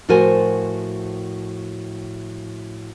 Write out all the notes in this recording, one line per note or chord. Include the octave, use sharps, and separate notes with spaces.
A2 F3 F#4 A#4 C5 G#5